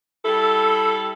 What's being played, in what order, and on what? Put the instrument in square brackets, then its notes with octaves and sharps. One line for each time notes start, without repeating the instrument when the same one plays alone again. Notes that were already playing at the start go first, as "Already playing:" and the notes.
[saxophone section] G3 E4 A4